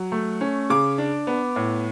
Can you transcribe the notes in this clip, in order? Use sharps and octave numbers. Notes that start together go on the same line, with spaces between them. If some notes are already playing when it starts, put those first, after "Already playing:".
Already playing: F#3
A3
C#4
C#3 D6
D4
B3
A2